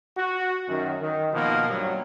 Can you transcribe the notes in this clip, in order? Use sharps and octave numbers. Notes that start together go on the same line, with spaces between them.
F#4
F#2 D#3
D#3
B2 D#3 F3 A#3
G2 F#3